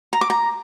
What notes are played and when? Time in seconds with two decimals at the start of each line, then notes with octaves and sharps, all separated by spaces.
0.13 A#5
0.21 D6
0.30 A#5